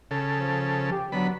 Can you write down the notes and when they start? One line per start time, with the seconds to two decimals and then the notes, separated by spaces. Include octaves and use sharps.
0.11 C#3 A4
0.32 F3
0.91 G4
1.12 D3 F#3 B3 B5